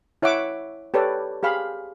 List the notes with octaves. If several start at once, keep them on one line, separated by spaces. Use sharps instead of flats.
E4 C#5 E5 F#5 D6
G4 A4 B4 C#5 D5
G4 G#4 F5 B5